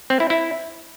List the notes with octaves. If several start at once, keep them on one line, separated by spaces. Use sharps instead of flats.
C4
E4
E4